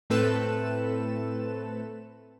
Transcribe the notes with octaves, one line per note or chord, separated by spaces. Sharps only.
A2 A3 C4 A4 B4 E7